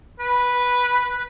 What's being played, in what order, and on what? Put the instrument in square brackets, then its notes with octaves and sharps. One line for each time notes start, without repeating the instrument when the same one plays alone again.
[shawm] B4